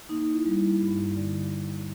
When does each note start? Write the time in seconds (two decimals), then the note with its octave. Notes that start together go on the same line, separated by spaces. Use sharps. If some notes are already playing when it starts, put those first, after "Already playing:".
0.09 A#3 D#4
0.33 E4
0.45 G3
0.57 E4
0.81 G2
1.17 D3